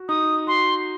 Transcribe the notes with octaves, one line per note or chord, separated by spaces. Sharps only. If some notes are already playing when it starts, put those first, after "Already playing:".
Already playing: F#4
D#4 D#6
F#4 C6